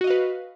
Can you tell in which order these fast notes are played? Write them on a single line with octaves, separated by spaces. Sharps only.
F#4 D#5 F5 B4